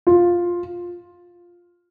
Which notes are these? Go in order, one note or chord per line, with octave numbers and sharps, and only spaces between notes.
F4